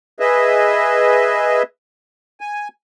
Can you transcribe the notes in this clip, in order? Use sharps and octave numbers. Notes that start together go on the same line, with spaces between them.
G#4 B4 D#5 E5
G#5